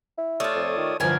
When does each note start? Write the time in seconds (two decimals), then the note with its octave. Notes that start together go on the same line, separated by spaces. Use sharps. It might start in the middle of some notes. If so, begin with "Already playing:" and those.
0.18 E4
0.40 A3 F4 C#5 D5 D#6
0.55 F2
0.78 D#3
1.00 G1 E3 F3 A#4 G#5